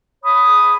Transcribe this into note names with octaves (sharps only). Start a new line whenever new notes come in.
C#5 B5 D#6
G#4